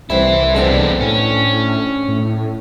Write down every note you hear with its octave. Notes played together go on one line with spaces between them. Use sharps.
C2 E3 G3 C4 E4 C5
G#3 B3 C4 D4 A4
A2 C#4
A2